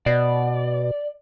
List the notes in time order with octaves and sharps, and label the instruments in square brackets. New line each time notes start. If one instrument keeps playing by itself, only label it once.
[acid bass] B2 [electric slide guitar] D5